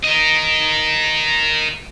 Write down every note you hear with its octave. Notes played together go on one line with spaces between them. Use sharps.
A#4 D#5